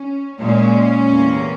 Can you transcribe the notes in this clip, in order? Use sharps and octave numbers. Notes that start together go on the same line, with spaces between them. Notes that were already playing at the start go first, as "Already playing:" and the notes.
Already playing: C#4
A#2 G#3 C#4
E2 C3 E3 A#3